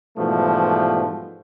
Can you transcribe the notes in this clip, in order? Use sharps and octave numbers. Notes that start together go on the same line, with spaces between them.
G#2 B2 E3 F3 G3 A3